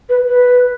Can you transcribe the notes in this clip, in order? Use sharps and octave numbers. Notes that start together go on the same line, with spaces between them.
B4
B4